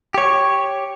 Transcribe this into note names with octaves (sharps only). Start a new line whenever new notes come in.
G4 C#5